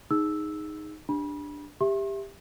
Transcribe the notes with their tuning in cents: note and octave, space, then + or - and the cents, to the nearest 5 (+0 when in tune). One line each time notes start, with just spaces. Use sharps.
D#4 +0 G#4 +0 E6 +0
D4 +0 G4 +10 B5 -30
G4 +15 E5 +0 C6 +45